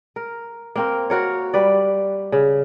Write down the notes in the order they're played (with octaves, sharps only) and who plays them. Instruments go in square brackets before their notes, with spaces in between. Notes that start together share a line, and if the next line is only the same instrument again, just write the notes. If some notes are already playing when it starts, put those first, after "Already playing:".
[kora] A#4
A#3 C4 A#4
F#4 A#4 C#5
G3 B4 D5
C#3